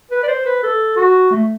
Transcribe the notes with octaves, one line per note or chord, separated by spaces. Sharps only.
B4
D5
C5
B4
A4
F#4
A3